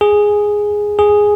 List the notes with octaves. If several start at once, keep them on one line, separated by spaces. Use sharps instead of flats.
G#4
G#4